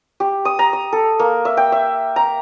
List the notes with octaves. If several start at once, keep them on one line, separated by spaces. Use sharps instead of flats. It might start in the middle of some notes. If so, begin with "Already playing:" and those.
G4
D#6
A#5
D#6
A4
A#3
E5
G5
E5
A#5